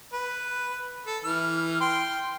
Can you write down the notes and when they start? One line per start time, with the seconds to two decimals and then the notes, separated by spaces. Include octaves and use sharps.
0.13 B4
1.06 A4
1.24 E3 F6
1.80 G5 C6